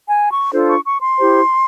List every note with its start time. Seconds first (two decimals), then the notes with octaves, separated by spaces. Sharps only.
0.08 G#5
0.30 C#6
0.52 D4 F4 A4 C5
0.68 C#6
0.84 C#6
1.01 C6
1.18 E4 G4 C5